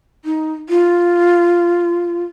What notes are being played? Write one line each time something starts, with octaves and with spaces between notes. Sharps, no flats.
D#4
F4